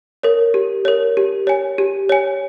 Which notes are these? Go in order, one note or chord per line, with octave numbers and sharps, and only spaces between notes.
A#4 C#5
G4
A#4 C#5
G4
C#5 G#5
G4
C#5 G#5